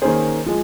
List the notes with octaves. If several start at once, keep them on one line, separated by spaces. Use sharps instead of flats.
D#3 A#3 C#4 G#4 C5
F3 G#3